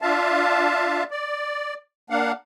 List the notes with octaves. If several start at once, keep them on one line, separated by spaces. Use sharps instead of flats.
D4 F4 E5 F5 A5
D5
A#3 D4 F5 F#5